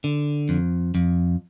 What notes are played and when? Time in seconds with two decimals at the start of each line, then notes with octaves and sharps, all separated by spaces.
0.04 D3
0.49 F2
0.95 F2